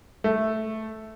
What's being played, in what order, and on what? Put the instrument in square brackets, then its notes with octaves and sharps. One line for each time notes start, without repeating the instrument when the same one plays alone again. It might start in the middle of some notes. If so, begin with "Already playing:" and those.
[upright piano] A3